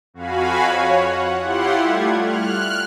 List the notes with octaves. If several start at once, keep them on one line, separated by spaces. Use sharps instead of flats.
F2 F#4 F5 G#5 B5
C#5
F#5
E4 F4 G4 F#5 C6
G3 A3 G#6
F6 F#6